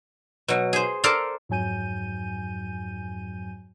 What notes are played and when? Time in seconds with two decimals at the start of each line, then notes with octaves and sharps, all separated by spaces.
0.48 B2 F#3
0.73 G#4 C5
1.04 A4 A#4 C5 D5 F5
1.49 F2 G#2 F#3 G#5 G6 D#7